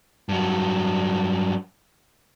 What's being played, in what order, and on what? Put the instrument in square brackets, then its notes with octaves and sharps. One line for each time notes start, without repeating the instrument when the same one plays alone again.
[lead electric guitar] G2 F#3